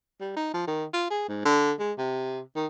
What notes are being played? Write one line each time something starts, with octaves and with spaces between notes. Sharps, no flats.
G3
D#4
F3
D#3
F4
G#4
G#2
D3
G#3
C3
D#3